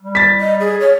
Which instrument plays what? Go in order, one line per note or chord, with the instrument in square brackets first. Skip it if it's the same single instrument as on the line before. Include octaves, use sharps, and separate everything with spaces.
[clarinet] G3
[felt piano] A6 B6
[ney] D#5
G#4
C#5